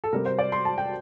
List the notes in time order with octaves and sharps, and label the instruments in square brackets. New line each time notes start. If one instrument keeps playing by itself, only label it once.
[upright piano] A4
C3 G3 C4 A#4
C5
D5
C6
A5
G5